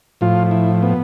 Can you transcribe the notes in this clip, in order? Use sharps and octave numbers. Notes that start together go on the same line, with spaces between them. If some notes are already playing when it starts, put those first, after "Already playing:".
A2 F3 F4
E4
B3